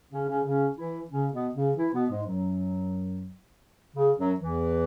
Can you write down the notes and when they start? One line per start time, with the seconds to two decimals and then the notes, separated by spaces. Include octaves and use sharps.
0.12 C#3 C#4
0.28 C#3 C#4
0.45 C#3 C#4
0.78 E3 E4
1.11 C#3 C#4
1.33 B2 B3
1.54 C#3 C#4
1.77 E3 E4
1.93 B2 B3
2.10 G#2 G#3
2.26 F#2 F#3
3.96 C#3
4.18 F#2 F#3
4.39 E2 E3